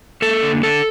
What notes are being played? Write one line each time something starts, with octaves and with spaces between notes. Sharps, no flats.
A#3 A4
D3
D3 A4